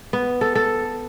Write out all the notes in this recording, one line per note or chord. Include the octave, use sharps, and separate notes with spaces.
B3
A4
A4